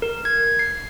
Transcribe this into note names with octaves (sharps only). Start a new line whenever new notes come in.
A#4
G#6
C7